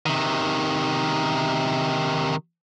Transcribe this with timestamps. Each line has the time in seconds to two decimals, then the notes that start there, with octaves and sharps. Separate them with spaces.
0.06 C3 D#3